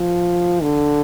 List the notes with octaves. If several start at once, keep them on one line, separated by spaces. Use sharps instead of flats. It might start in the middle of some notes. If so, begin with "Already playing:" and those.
Already playing: F3
D3